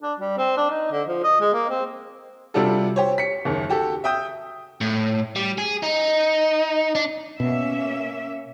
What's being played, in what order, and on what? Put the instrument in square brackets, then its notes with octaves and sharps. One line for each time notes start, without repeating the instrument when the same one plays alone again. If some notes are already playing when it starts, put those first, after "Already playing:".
[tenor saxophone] D4
G3
C4
D4
D#4
D3
F3
D#5
G#3
A#3
C4
[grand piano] C3 G3 D4 F4 F#4 A4
G4 C5 C#5
B6 C#7
F#1 D#2 D#3
F#4 G4 A4
E5 G5 D#6 G6
[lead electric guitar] A2
G3
G#4
D#4
D4
[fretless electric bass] B2 [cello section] A#3 C#4 E5